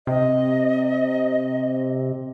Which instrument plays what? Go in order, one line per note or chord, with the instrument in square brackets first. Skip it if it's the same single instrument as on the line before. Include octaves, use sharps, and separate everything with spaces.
[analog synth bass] C3 [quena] D#5